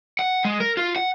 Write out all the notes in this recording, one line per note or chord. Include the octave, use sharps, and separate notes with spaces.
F#5
G#3
A#4
F4
F#5